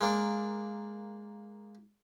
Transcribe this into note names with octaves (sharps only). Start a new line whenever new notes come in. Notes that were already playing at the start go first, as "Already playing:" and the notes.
G#3 A#3 D4